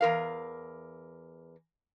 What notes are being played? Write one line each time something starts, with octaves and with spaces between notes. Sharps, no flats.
E2 A#4 F5